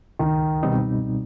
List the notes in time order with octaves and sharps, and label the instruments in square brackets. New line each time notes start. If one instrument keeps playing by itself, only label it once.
[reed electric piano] C#2 [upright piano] D#3
[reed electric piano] B2 G3 C4 D#4